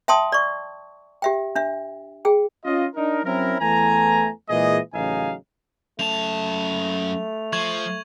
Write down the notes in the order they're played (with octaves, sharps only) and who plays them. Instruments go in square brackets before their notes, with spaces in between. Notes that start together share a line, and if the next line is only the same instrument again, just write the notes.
[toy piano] E5 G5 A5 C6 D#6
D5 C#6
G4 E5 G5
D4 E5
G#4 G5
[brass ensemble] C#4 F4 D#5
D4 D#4 A#4
F#3 C4 C#4 E4 A#4
E2 E3 A3 G#5 A#5
A#2 E3 G#3 G#4 D#5
A1 C#3 F#3 D#4 F5 G#5
[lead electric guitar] F#2 A5 [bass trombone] A3 [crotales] F7
[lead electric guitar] F3 [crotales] C#6 G#6 F#7